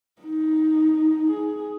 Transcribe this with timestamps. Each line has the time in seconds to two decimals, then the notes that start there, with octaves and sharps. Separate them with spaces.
0.21 D#4
1.30 G#4